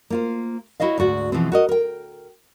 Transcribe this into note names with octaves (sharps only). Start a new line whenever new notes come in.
A#3 F4 C5
E4 F#4 C#5 D#5 F5
D2 G#2 F#4 D5
B2 E3 F3 G#3 C4
F#4 A#4 D#5
A#4 G5